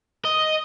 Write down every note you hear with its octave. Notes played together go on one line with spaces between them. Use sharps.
D#5